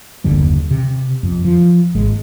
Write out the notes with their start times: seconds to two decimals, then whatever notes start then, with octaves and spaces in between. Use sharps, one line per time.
0.24 F#1 D#2 D3 G3
0.71 C3
1.23 F2
1.45 F3
1.95 G#1 G#3